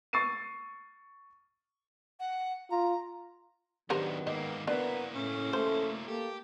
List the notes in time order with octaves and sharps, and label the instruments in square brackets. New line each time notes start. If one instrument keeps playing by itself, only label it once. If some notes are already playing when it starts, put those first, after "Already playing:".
[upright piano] C#6 E6 A6 C7 D#7
[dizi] F#5
[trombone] F4 [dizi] A#5
[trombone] D#3 [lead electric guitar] F#3 D4 [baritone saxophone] B3 [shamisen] G4 A#4 C5
[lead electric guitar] G#2 A#3 [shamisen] D#5
[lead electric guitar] A#3 E4 [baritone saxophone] B3 [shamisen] D4 [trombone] A#4
[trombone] A2 [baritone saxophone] C#4
[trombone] A3 [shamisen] C5
[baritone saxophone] A3 [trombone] A#3 [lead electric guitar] G4